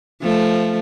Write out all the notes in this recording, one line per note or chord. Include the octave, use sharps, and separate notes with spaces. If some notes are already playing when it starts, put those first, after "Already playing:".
F3 A3